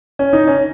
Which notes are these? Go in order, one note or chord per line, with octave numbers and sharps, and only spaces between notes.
C#4
D#4
C#4